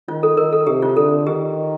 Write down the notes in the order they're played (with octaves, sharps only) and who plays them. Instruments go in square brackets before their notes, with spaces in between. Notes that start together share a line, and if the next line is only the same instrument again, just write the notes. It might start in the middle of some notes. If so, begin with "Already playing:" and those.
[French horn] D#3 [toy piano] F4
[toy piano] A4
[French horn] D#3 [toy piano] A#4
[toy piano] A4
[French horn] C3 [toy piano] G4
[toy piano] F4
[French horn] D3 [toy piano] A4
[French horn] D#3 [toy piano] G4